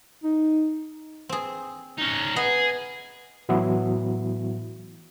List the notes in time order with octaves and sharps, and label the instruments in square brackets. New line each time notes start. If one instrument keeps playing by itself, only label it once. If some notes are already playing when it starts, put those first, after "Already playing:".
[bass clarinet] D#4
[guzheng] C4 G#4
[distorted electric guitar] C#4 D#4
[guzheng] B3 D#5 [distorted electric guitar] G#4
[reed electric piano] A2 E3 F#3 B3 E4 F#4